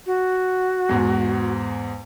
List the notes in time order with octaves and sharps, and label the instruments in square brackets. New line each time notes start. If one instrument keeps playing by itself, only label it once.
[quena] F#4
[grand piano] E2 G#2